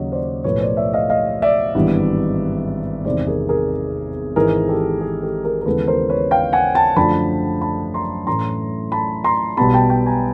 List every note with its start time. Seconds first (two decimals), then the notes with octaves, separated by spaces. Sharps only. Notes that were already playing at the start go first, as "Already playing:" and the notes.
Already playing: D#2 C#3 F#3 A#3 C#5 D#5
0.12 C5 D5
0.44 B1 A2 F3 A3 B4 C#5
0.61 C5 D5
0.77 D5 E5
0.93 D#5 F5
1.10 D#5 F5
1.42 D5 E5
1.75 G#1 G2 E3 G3 B3
3.05 E2 C3 D#3 G#3 C5 D5
3.27 G#4 A#4
3.49 G#4 A#4
4.36 G#1 G#2 E3 G#4 A#4
4.68 G4 A4
5.01 G#4
5.22 G4 A4
5.44 G#4 A#4
5.61 A#4
5.66 D#2 C#3 E3 G#3 B3 A4 B4
5.88 A#4 C5
6.09 B4 C#5
6.31 F5 G5
6.53 F#5 G#5
6.75 G5 A5
6.96 F#2 D3 F3 A3 D4 A5 B5
7.62 A5 B5
7.94 A#5 C6
8.27 A2 E3 A3 C#4 A#5 C6
8.92 A5 B5
9.24 A#5 C6
9.57 B1 B2 G3 B3 A5 B5
9.74 G5 A5
9.90 G5 A5
10.06 G#5 A#5